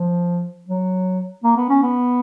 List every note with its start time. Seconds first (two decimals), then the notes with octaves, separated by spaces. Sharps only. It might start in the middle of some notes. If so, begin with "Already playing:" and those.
Already playing: F3
0.68 F#3
1.44 A#3
1.56 B3
1.69 C#4
1.82 B3